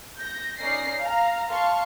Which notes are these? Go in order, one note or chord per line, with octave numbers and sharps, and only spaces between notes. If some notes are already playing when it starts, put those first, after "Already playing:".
G6 A#6
C#4 D#4 D5 A#6 C7
F5 A#5
F5 A5 C6 C#6